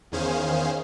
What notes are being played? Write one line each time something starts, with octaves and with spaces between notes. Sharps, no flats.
E2 D#3 C#4 G#4 C5 F5